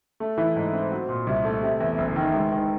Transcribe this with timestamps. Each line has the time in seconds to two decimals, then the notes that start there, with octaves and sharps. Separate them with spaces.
0.20 A3
0.37 E3
0.56 G#2
0.73 C4
0.91 F#3
1.09 A#2
1.27 C2
1.45 A3
1.63 C3
1.80 E2
1.98 F#1
2.16 D#3
2.34 G#3
2.52 D#3